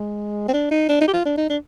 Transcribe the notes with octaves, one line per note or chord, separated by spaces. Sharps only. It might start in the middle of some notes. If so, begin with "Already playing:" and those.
Already playing: G#3
C4
D4
D#4
D4
D#4
G4
F4
D4
D#4
D4